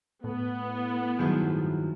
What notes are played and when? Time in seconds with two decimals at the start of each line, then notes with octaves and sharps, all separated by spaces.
0.24 A2 B3
1.19 G2 D#3 F3 F#3 E4 G#4